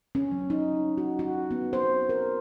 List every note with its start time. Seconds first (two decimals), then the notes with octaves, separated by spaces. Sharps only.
0.15 C#4
0.32 F#3
0.50 D#4
0.98 F#4
1.19 F#4
1.51 B3
1.73 C5
2.09 A#4